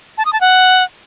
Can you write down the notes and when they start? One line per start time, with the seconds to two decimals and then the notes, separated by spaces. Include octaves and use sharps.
0.18 A5
0.25 D#6
0.33 A5
0.41 F#5